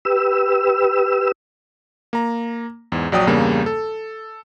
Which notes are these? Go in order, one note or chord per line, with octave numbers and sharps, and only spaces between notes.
G4 B4 E6
A#3 A#5
E2 G#2
A#1 F#3 D5 G5 D#6
E2 G2 C#3 G3 A#3
A4